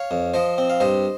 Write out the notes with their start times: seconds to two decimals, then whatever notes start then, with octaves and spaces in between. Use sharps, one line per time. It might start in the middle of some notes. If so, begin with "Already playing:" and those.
Already playing: C#5 F5
0.11 F2
0.34 F3 C5 D#5
0.58 C4
0.70 F5
0.80 G2 C5 D#5